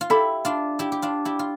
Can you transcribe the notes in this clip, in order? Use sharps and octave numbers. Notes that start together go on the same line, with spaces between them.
F4
E4 G4 A4 E5 B5
D4 F4
E4 G4
G4
D4 F4
E4 G4
F4